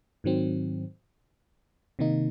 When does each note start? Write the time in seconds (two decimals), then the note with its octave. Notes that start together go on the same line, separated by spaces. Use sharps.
0.24 G#2 D#3 F#3 C4
1.99 C3 D#3 A#3 D#4